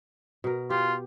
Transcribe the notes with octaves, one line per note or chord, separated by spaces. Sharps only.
B2 A#4
F4 G4